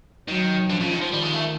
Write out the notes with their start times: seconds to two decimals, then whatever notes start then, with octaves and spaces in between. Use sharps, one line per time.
0.28 D#3 F#3
0.69 D3 F3
0.80 C#3
0.91 D#3
1.01 F3
1.12 D#3 G3
1.22 G#3
1.33 A3